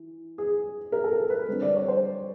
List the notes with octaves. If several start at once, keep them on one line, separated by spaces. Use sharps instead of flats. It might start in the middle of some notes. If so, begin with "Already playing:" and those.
Already playing: E3
G#4
A#4
A4
A#4
B4
D3 G3 C4
D5
C#5
C5